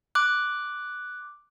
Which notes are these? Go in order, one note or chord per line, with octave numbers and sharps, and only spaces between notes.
D6 F#6